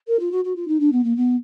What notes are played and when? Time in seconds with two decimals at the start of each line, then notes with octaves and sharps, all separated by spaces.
0.07 A#4
0.19 F4
0.31 F#4
0.44 F#4
0.55 F4
0.67 D#4
0.79 D4
0.92 B3
1.03 A#3
1.16 B3